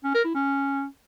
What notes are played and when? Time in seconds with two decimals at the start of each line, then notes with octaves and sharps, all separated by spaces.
0.04 C#4
0.14 A#4
0.24 E4
0.34 C#4